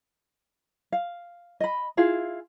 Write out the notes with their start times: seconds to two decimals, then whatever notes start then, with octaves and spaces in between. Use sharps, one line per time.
0.92 F5
1.60 D#5 B5
1.97 E4 F4 G#4 F5